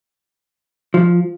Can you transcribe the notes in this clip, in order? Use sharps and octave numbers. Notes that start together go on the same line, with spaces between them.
F3